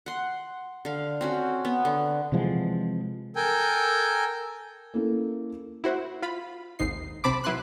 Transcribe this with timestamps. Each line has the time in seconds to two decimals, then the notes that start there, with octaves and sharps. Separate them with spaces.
0.06 F#5 C6
0.85 D3 F5
1.21 C4 C#4 F#4
1.65 B3
1.85 D3
2.32 C3 E3 F3 G#3
3.36 A4 A#4 G5 G#5
4.94 A#3 C#4 E4 A4
5.84 E4 F#4 C5
6.22 F4 B5
6.79 G#1 D#2 G#2 D#4 C7
7.24 B1 C3 C4 A5 B5 D6
7.44 F#3 E4 B4 C6 F#6